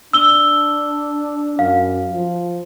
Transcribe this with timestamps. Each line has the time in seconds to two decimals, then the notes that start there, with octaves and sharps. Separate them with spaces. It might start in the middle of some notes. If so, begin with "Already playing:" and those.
0.13 D4 E6 G7
1.59 F#2 F5
2.12 F3